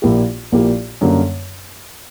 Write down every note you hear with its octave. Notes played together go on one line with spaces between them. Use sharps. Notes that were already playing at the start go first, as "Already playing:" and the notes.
A#1 A#2 A#3 E4 G4
A#1 A#2 A#3 E4 G4
F#2 D3 G3 A#3